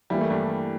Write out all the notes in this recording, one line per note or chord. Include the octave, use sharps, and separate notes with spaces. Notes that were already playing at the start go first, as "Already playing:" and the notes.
E3 G3 A#3 E4
A3
G2 G3